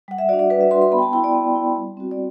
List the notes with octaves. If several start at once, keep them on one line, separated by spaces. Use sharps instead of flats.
G3 F#5
E5
D4 F#4 D5
D5
G3 B4
E5
D4 F#4 C6
C6
B3 B5
G5
A5
E4 G5
D5
B3
E4
G3
C4 F#4
D5